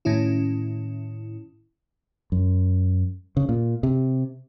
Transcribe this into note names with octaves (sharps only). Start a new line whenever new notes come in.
A2 D#3 C#4 E4
F#2
C#3
A#2
C3